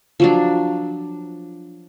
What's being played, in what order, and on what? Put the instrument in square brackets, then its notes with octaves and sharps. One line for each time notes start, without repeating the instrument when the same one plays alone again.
[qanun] F3 F#3 D4